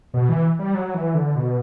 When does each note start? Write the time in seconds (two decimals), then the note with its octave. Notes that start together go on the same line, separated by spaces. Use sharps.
0.14 B2
0.29 E3
0.59 G3
0.75 F#3
0.94 E3
1.15 D3
1.36 B2